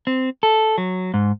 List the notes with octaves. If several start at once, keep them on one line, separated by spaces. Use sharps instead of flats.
C4
A4
F#3
G#2